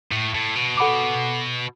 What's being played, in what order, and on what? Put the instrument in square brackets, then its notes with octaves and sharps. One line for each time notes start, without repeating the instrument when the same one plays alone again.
[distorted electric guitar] A2
A2
B2
[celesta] A4 F#5 B5 D6